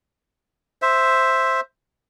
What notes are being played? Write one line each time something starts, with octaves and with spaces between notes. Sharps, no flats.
C5 E5